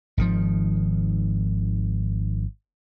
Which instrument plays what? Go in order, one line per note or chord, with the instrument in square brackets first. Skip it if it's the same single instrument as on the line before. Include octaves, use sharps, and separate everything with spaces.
[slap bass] G#1 D#3 F3